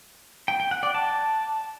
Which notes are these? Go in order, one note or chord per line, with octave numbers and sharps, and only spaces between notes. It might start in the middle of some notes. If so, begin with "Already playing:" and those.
G5
G5
F#5
D5
A5